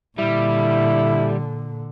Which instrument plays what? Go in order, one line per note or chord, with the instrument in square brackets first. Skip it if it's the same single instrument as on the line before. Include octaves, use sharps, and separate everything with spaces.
[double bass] A#2 D3 [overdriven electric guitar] G3 [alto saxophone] E4